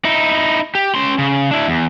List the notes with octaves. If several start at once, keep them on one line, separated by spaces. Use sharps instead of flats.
D#4 E4
G4
C#4 C6
C#3
D4 E4
E2